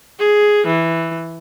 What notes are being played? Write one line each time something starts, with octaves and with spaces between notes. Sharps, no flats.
G#4
E3